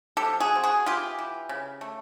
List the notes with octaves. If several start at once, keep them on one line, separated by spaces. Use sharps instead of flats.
G4 A4
F3
F#4 G#4
C4
F#4 G#4
E3 F4 G4
E3
C#3
A3